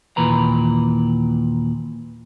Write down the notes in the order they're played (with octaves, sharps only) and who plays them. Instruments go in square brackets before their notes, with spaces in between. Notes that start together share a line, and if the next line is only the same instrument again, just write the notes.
[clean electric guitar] D#2 A#2 E3 B4 A#5